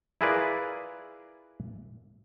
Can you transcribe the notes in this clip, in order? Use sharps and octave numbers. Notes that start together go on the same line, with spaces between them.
E4 F4 G#4 A#4 B4 D5